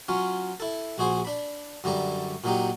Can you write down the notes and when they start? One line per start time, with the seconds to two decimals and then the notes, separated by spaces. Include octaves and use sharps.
0.09 F#3 C#4 F4
0.60 E4 A4
0.98 A#1 F#4 G#4 C5
1.25 D4 B5
1.84 F#2 D3 G3 D5 A#5
2.44 A#2 F#3 D#4 G4